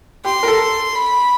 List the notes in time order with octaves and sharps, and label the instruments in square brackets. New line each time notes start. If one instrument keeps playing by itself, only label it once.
[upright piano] G4 [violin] C6
[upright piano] A#4
A4
[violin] B5